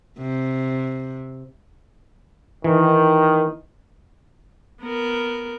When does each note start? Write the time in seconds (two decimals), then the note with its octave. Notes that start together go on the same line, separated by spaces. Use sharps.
0.18 C3
2.64 D#3 E3
4.82 B3 A#4